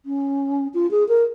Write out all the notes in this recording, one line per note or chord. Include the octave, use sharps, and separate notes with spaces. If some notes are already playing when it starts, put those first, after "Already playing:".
C#4
F4
G#4
A#4